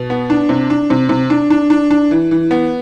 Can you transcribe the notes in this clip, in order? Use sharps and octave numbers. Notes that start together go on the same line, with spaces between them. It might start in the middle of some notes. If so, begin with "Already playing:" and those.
Already playing: B2
B3
D4
C3
D4
C3
C3
D4
D4
D4
D4
E3
E3
B3